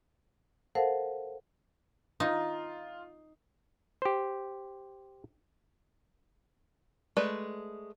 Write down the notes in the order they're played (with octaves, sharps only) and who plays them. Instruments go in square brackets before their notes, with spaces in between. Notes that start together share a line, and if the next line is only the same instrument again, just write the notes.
[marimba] A4 A#4 C5 F5 F#5 A5
[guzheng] D#4 [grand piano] F4
[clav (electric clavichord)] G4 C5
[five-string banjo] G#3 A3 B4 D5